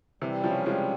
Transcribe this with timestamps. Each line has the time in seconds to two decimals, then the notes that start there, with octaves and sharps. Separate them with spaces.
0.22 C3 E3 G3
0.44 C#3 F3 C#4
0.66 F3 G3 G#3